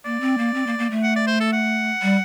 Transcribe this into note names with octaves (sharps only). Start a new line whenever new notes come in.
A#3 D5
C4
A#3
C4
A#3
A#3
A3
F#5
D5
C5
A4
F#5
G3